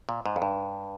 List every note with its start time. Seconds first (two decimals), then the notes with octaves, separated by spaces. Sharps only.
0.09 A#2
0.26 G#2
0.36 F2
0.42 G2